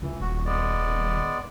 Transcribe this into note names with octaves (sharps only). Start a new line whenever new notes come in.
C#2 E3
D#1 F#4
G#3 B3 D5